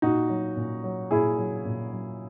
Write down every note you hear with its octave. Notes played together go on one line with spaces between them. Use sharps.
A#2 D#4 F#4
F#3
A#2
F#3
A#2 E4 G#4
F#3
A#2
F#3